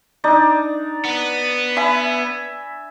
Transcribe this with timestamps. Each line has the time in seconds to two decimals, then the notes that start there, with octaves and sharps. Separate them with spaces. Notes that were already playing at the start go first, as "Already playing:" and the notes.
0.24 D4 D#4 D5
1.05 B3
1.76 E5 G#5 B5